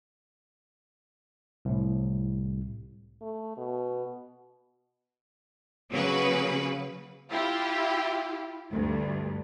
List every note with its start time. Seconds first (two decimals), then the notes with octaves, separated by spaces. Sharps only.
1.65 C2 A2
3.22 A3
3.57 B2
5.91 C#3 F#3 A#3 C#4 B4
7.31 E4 F4 G4
8.71 D2 G2